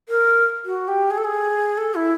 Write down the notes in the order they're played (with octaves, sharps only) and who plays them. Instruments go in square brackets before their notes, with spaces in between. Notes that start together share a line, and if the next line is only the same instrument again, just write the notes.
[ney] A#4
F#4
G4
G#4
A4
G#4
A4
E4